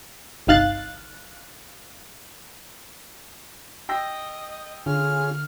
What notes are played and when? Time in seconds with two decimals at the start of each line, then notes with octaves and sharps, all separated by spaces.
0.47 G1 C2 D#4 F5 F#6 A6
3.89 D#5 G5 E6 A#6
4.86 D3 C#4 F4 G#4 F6